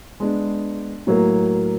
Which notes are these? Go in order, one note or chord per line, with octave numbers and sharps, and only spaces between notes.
G#3 B3 D4
A2 F#3 A#3